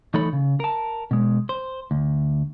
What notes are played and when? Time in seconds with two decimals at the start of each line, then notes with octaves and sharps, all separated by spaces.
0.14 E3 A3 D#4 A4 C#5 B5
0.33 C#3
0.60 A#4 A5
1.11 B2 G#3
1.49 C5
1.91 D2